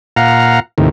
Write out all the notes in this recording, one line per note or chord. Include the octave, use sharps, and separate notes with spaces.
A#2 F5 F#5 A#5
D#2 A2 C3 D#3